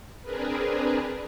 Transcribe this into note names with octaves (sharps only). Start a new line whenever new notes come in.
C4 D4 G#4 A#4 B4